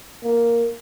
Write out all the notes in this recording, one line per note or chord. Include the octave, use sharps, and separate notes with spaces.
A#3